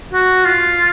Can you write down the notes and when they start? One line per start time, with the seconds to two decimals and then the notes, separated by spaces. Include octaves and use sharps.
0.13 F#4
0.45 F4